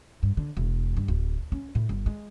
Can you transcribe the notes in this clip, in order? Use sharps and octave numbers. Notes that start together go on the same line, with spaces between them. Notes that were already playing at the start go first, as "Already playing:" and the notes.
G2
D3
E1
G2
D1
C#4
A2
G1
G#3